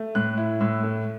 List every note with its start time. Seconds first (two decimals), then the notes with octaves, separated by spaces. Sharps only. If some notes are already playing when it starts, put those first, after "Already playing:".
Already playing: A3
0.15 A2 F#6
0.37 E4
0.61 A2 E6
0.83 A3